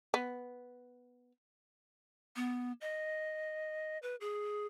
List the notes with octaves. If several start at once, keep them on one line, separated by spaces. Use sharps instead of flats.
B3
B3
D#5
B4
G#4